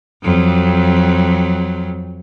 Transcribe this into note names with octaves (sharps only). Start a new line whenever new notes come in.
F2 F#3